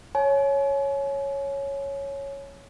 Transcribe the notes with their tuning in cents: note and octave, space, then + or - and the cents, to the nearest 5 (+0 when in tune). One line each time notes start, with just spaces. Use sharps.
C#5 +0 G#5 +40